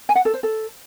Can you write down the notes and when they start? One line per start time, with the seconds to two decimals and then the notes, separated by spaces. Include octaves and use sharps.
0.09 G#5
0.15 F#5
0.25 A4
0.34 C5
0.43 A4